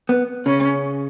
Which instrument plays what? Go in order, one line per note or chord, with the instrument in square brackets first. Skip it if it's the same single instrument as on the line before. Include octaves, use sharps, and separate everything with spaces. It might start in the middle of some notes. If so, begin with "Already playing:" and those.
[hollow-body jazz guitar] B3
[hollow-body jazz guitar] C#3 [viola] C#4